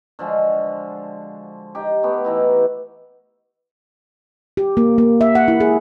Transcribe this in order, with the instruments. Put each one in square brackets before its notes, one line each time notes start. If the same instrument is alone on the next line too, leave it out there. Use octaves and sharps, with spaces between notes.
[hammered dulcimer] D3 F3 G#3 F#4
D#4 G4
A3 B3 G4
E3 D#4 E4
[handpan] G4
A#3
A#3
E5
F#5
E4
G#4